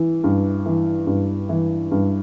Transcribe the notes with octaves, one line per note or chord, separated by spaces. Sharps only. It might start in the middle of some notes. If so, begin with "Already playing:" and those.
Already playing: E3
G2
E3
G2
E3
G2